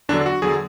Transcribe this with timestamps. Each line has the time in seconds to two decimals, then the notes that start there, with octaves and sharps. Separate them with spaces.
0.09 E2 D3 F#3 D4
0.26 F#4
0.42 E2 D3 F#3 G#4